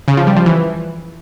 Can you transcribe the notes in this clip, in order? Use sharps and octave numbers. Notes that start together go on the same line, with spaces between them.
C#3
F3
G3
F3
E3